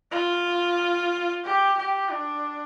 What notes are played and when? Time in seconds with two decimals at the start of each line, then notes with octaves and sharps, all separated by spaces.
0.11 F4
1.44 G4
1.78 G4
2.11 D4